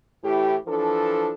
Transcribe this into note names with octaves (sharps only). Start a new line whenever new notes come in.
A2 E3 E4 G4
E3 F3 D4 A4